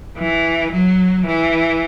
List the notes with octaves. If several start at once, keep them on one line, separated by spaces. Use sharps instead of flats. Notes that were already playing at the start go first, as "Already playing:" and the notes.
E3
F#3
E3